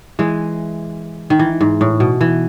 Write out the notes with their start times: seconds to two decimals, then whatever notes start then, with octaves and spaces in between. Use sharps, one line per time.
0.19 E3 G#3
1.30 D#3
1.39 E3
1.61 G#2
1.81 A2
2.00 B2
2.21 E3